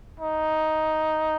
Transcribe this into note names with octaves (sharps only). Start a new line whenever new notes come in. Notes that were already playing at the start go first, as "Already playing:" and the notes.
D#4